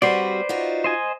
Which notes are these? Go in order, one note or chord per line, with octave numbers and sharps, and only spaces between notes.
G3 C4 F#4 B4 C5 D5
D#4 F4 F#4
C5 D#5 G#5